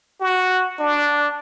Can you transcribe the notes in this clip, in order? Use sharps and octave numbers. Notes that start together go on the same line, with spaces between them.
F#4
D4